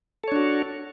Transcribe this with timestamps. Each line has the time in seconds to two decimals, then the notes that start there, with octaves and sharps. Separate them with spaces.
0.24 A4
0.28 C#5
0.32 D4
0.36 F#4